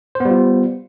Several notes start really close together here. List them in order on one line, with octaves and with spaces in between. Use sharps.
C5 B3 G3 F4